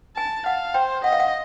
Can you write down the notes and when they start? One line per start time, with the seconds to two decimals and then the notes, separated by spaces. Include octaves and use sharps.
0.17 G#5 A5
0.46 F5 F#5
0.74 C5 G5
1.04 D#5 F#5
1.13 F5
1.20 F#5